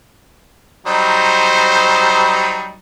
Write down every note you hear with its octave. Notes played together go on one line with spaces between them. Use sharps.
F#3 G3 D#4 C5